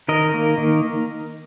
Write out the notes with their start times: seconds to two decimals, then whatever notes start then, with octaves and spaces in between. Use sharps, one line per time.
0.08 D#3 A#4 D#5
0.34 A#3
0.58 D#3